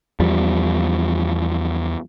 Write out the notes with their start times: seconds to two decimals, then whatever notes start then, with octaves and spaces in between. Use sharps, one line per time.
0.20 E2 F3 G3